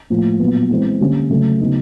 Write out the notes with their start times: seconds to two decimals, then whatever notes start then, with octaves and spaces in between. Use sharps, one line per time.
0.10 A2 F3 A#3
0.39 A#2 F#3 B3
0.71 E3 G#3 C4
1.01 D3 G3 A#3 C#4
1.30 C#3 F#3 A3
1.61 C#3 F#3 B3 D#4